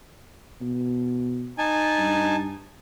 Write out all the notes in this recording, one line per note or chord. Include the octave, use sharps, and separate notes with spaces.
B2
D#4 G#5 A5
G2